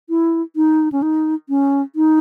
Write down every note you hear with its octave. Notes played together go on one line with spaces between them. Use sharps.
E4
D#4
C#4
D#4
C#4
D#4